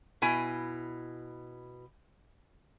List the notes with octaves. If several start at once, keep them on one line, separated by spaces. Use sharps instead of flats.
B2 E4 G#5